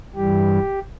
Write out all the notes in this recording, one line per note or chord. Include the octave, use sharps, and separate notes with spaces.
G2 E3 G3 G4